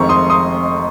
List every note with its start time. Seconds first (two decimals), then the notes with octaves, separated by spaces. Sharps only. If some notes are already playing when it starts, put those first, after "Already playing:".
Already playing: F1 F2 D#3 G#3 C4 A#5 C#6
0.09 C6 D#6
0.30 C6 D#6